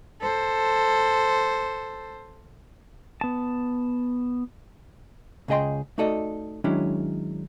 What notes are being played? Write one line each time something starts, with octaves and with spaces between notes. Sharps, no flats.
A4 C5
B3 A5
C#2 C#3 G#4 D#5 G5 C6
A3 D#4 F#4 A4 D5 D#5
D#3 F#3 G#3 C#4 D4 E4